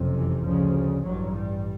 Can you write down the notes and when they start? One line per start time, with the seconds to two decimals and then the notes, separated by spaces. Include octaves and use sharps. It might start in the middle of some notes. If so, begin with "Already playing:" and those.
Already playing: F#1 F2 C3
0.16 E3
0.45 D2 C#3 F3
1.03 A1 G2 F#3
1.32 G3